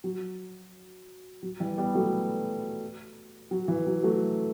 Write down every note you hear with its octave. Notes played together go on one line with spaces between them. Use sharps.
F#3
F#3
E3 G3
G3 B3
F#3 A3
F#3
E3
F#3
F#3 A3